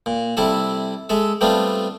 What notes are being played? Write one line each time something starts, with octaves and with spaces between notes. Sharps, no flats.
A#2
C3 G3 E4 A4 E5
G#3 A4 E5
G3 A3 B3 C4 D4 F4